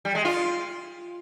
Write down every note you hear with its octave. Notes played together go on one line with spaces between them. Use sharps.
G3
G#3
F4